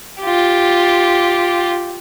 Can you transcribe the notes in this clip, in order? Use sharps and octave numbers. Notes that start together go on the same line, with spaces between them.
F4 G4